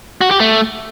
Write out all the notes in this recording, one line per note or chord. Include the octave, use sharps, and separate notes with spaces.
F#4
G4
A3